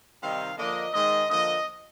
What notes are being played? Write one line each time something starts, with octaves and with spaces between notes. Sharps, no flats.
C3 D#3 G3 C4 D#4 F5
D3 F3 A#3 D4 D#5
G#2 D#3 G#3 D#5
D3 F3 A#3 D#5